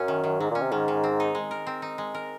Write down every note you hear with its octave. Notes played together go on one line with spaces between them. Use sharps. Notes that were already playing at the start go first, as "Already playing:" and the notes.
Already playing: F#2 F#3 C#4
D#3
D#3
G#2 F#3
A#2 C#4
C3
G#2 D#3
D#3
C4
D#4
G#3
A#4
C4
D#4
G#3
A#4